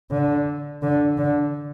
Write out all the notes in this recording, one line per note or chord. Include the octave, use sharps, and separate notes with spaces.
D3
D3
D3